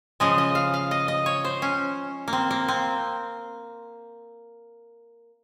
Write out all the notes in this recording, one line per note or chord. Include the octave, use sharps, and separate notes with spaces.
C#3 F3 G#3 D#5
D#5
F5
F5
D#5
D#5
C#5
C5
C#4
A#3
C4
A#3
C4